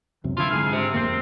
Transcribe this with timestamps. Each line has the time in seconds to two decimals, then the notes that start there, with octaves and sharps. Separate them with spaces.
0.24 C#2 F#2 C3
0.38 C2 D3 D#3 E4 F4
0.51 F2 G#2 D3 G#4 F5
0.73 C3
0.94 G#1 F2 A#3 C4